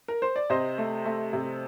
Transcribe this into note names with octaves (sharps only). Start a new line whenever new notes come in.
A#4
C5
D5
C3 C5 D#5
A3
A3
C3